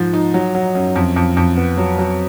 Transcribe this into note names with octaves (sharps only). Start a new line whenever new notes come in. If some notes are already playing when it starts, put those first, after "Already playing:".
Already playing: G#2 F3
D#4
F#3
F#3
F#2
F2
F2
F2
B3
F#3
F#3